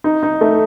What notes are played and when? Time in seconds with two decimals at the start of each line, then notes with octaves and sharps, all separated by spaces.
0.04 D#4
0.23 D#4
0.41 A3